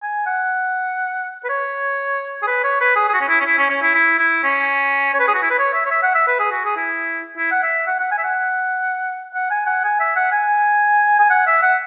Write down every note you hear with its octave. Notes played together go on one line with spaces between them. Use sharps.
G#5
F#5
B4
C#5
G#4
B4
C#5
B4
G#4
G#4
F#4
C#4
E4
C#4
E4
C#4
C#4
E4
E4
E4
C#4
C#5
B4
G#4
F#4
E4
B4
C#5
E5
C#5
E5
F#5
E5
B4
G#4
F#4
G#4
E4
E4
F#5
E5
F#5
F#5
G#5
E5
F#5
F#5
G#5
F#5
G#5
E5
F#5
G#5
G#5
F#5
E5
F#5